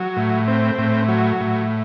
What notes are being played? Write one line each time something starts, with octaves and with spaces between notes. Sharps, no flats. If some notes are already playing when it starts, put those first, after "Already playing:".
Already playing: F#3
A2
C4
A2
F#3
A2